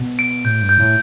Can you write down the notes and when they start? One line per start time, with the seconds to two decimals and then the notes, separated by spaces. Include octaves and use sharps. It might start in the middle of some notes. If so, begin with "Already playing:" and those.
Already playing: B2
0.19 D7
0.44 A2 G6
0.62 G2
0.69 G6
0.78 A2